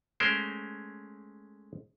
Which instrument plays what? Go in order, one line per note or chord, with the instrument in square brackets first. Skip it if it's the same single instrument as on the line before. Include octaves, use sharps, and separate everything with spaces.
[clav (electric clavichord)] G#3 A3 C#4 A#4 C5